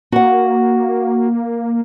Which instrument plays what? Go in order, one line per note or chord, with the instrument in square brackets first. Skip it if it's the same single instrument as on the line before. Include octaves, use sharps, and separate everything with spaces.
[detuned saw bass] A#3 [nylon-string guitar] F#4 F#5